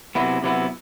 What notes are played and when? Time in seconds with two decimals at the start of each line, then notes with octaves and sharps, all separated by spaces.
0.15 C3 F#3 B3 E4
0.43 C3 F#3 B3 E4